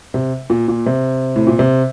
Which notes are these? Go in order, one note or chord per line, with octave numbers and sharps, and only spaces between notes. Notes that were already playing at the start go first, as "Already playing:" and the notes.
C3
A#2
A#2
C3
A2
A#2
C3